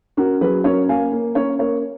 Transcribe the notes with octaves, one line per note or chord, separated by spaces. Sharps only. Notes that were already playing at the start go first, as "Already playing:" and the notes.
C#4 F#4 A#4
F#3 G#4 B4
C#4 A#4 C#5
A#3 F5 G#5
A#3
C#4 A#4 C#5
A#3 A#4 C#5